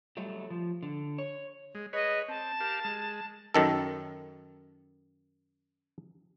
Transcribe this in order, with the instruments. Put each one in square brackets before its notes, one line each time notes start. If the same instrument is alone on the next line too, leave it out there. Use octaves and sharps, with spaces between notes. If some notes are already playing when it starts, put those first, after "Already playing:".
[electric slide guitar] F#3 G3 A3
F3
D3
C#5
[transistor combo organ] G#3
[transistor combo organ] G#4 B4 C#5 [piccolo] D#5
[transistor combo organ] C4 [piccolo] A5
[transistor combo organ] G4 A#4 F5
G#3
[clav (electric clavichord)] F#2 D#3 A4